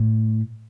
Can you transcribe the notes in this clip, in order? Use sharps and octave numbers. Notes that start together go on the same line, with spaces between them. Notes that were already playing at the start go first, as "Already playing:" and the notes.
Already playing: A2